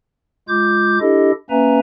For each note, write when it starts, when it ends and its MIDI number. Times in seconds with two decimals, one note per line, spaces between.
0.48 0.98 56
0.48 0.98 65
0.48 0.98 86
0.48 0.98 91
1.01 1.31 62
1.01 1.31 64
1.01 1.31 67
1.01 1.31 69
1.01 1.31 75
1.50 1.80 58
1.50 1.80 61
1.50 1.80 71
1.50 1.80 76
1.50 1.80 80
1.50 1.80 82